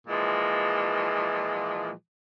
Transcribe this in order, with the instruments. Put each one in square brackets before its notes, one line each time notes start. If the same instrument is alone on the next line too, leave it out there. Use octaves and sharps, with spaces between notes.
[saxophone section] A#2 E3 F3 G#3